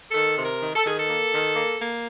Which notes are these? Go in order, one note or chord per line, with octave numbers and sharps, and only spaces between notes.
D#3 A4
C3
A#4
D#3
A4
D#3 G#4
A4
A#3
D#3
A#3
A#3